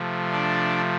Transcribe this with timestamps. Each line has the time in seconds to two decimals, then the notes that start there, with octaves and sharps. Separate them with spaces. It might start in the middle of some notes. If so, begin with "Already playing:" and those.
Already playing: C3 F3 A3
0.32 D4 D5